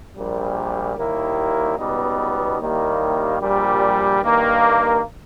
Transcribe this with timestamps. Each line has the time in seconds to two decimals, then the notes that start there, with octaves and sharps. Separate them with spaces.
0.16 A#1 A#2 G3
0.96 D#2 D#3 G3 A#3 E4
1.77 C#2 B2 G3 B3 D#4
2.59 D#2 D#3 G3 A#3 E4
3.39 A#1 A#2 G3
4.21 G2 D#3 A#3